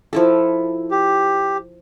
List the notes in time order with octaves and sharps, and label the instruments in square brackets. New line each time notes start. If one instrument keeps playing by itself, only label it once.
[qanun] F3 E4 A4
[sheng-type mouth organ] G4